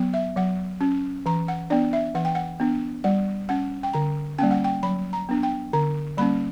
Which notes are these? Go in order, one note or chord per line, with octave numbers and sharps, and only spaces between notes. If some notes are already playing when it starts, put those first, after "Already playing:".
Already playing: F#3 B3
E5
F#3 F#5
C#4
E3 A#5
F#5
B3 D4 D5
E5
E3 F#5
G5
F#5
B3 D4
G3 F#5
C#4 F#5
G5
D3 A#5
G3 A#3 C#4 G5
F#5
G5
F#3 B5
A#5
B3 D4
G5
D3 A#5
G3 A#3 C#4 B5